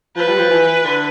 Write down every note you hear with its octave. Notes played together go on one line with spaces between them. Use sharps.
F3 B4
G3
F3
E3
D3